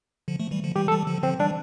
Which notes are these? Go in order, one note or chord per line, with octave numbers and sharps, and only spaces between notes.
D3 F3
F3 A3
E3 G3
D3 F3
E3 G3 G4
A4
E3 G3
D3 F3
D3 F3 C4
E3 G3 D4